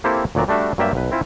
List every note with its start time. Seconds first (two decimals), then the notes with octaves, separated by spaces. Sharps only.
0.04 A#3 C4 E4 G4 A4 C5
0.35 D2 A#2 F#3 D5 A#5
0.48 G3 A3 D4 F#4 E5
0.78 G2 F#3 A#3 G4 D5 E5
0.95 B1 B4
1.12 C4 E4 F4 G#5